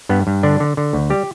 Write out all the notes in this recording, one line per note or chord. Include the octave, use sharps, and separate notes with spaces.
G2 B3
G2
D3 D4
D3
D3
D2
G3 G4